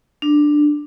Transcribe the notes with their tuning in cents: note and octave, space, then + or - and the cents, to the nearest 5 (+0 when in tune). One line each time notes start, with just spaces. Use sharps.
D4 +10